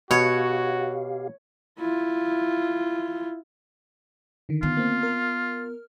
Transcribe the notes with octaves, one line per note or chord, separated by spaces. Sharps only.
B2 F#4 G4 C#5 F5
E4 F4
D3 D#3
B3 F4
A#3 C4
A#4 F6